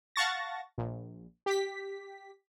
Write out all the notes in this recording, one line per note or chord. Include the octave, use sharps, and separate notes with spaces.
F5 F#5 A5 C#6 A6 A#6
A#1
G4 B6